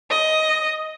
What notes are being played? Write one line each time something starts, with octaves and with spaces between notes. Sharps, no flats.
D#5